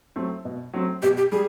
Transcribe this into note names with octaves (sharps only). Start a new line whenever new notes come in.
F#3 A3 C4
B2
F#3 A3 C4
B2 G4
G4
G3 G#4